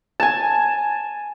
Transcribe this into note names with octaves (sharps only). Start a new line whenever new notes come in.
G#5 A5